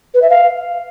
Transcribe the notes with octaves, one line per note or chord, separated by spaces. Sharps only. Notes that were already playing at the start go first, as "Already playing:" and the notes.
B4
E5
F5